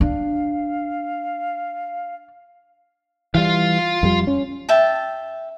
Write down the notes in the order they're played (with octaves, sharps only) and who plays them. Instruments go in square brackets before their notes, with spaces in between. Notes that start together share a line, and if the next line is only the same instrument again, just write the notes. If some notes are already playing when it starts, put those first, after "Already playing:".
[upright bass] D4 [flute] F5
[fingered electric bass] E3 G3 [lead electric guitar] F4 F5
[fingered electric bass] F2 G3
C#4
[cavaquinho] E5 G5 A5